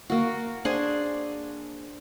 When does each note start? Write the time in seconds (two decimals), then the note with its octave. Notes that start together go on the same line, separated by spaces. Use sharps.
0.10 A#3 F#4
0.65 D4 G#4 C5 G#5